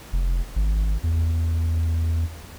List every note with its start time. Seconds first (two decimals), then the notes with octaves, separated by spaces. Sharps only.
0.13 F1
0.56 G#1
1.03 E2